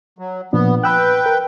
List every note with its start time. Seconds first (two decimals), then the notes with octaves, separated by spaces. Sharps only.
0.18 F#3
0.53 A#2 F3 B3 D4
0.84 B4 G5 B5 E6 F#6
1.26 A#4